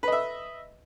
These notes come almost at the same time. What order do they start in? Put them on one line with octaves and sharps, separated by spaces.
B4 D#5 E5